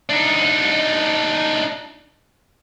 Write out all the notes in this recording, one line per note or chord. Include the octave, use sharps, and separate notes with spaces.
D4 D#4